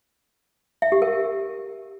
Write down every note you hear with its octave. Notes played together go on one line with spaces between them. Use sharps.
E5
G4
A#4